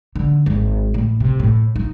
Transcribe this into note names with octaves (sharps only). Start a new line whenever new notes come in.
D3
G#1
A2
C3
A2
D#4